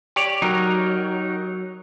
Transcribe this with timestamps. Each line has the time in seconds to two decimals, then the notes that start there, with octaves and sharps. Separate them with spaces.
0.16 G4 C#5 D5
0.42 F#3 D#4 A#4 A#5